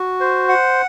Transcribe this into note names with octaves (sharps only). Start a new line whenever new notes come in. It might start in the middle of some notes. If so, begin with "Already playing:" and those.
Already playing: F#4
C5
F#5